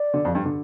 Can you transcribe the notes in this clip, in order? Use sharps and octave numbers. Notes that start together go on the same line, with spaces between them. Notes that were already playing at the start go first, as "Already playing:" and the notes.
Already playing: D5
D3
F2
G2
D3